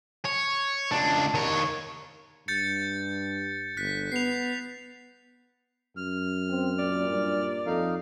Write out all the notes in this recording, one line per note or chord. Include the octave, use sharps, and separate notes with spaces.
C#5
C#2 D4
D#3 C#5
G2 G6 A6 C#7
G1 F#6 B6
B3 C7 F7
F#2 F6
C4
A#2 D5
G2
F2 D#4 A4 F5